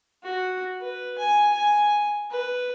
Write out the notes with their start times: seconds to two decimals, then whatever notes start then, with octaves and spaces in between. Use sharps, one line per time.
0.24 F#4
0.81 B4
1.18 G#5
1.53 G#5
2.31 B4